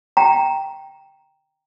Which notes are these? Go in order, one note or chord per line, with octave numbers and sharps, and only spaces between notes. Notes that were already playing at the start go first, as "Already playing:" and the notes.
G5 A#5